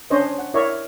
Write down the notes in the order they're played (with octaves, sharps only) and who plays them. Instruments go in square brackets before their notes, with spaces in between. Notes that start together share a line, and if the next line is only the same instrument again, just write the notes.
[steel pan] C#4 D4 C5 C#5 D#5
F#5
E4 A#4 C#5 D5 E5